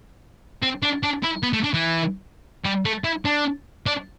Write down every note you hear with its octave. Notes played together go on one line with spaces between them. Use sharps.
C4
D4
D4
E4
B3
A3
D4
E3
G3
A3
E4
D4
D4